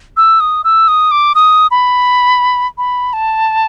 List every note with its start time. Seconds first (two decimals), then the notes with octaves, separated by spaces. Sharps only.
0.17 E6
0.40 D#6
0.64 E6
0.88 D#6
1.11 D6
1.35 D#6
1.71 B5
2.78 B5
3.13 A5